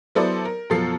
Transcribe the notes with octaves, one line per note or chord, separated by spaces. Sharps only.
F#3 B3 E4 A4 C5 D5
A#4
F#2 B2 F3 A4 C7